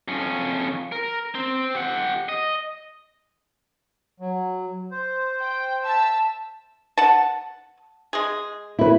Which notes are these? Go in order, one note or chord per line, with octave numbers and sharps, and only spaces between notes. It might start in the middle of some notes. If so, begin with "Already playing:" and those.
F2 C#4
A#4
C4
G4 F#5
D#5
F#3
C5
G5
E5 A5 E6
F#5 A5
G#3 G#4
E4 B4